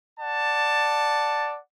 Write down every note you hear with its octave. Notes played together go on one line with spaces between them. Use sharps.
D5 F#5 A5